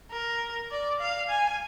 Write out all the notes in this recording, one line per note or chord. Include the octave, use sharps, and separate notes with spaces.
A#4
D5
F5
G#5